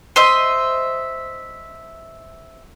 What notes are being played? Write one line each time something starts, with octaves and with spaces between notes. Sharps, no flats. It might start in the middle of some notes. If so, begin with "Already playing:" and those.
C5 D#5 E5